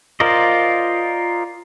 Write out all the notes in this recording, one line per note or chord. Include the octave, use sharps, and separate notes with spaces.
F4 A#4 C5 D5 D#5